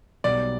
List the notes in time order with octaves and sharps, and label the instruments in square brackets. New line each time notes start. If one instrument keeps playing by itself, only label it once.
[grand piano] B1 B2 G3 B3 [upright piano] D5